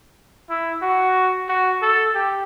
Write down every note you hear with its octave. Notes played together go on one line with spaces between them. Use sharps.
E4
F#4
F#4
A4
G4